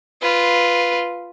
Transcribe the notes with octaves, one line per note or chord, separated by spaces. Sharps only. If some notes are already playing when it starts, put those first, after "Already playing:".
F4 B4